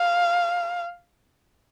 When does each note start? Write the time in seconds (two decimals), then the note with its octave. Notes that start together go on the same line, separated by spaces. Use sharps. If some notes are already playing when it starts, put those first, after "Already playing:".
Already playing: F5